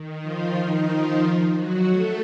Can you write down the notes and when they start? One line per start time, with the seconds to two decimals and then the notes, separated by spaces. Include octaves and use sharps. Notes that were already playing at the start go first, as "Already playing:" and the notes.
Already playing: D#3
0.22 F3 F4
0.56 D#3 D#4
0.89 F3 F4
1.56 F#3 F#4
1.89 A3 A4